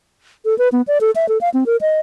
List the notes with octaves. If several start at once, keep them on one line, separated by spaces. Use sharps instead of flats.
A4
B4
B3
D5
A4
E5
A4
F5
C4
A#4
D#5